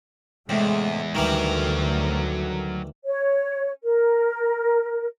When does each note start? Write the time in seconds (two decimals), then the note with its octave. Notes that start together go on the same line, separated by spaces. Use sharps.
0.49 E2 A2 C3 G#3
1.15 D2 D#3 E3 F#3 G3 A#4
3.06 C#5
3.83 A#4